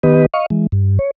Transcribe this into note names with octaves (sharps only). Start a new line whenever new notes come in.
D#3 B3 G4 B4 D#5
D#5 F5 C#6
E3 G#3
G2
C#5